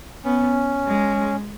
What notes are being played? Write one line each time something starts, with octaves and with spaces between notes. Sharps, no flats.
B3 C#4
G#3